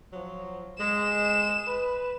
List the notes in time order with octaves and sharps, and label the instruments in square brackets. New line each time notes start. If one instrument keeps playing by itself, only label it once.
[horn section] F3 F#3
[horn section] G#3 [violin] E7
[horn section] B4